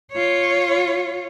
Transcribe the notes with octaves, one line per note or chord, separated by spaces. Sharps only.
F4 C#5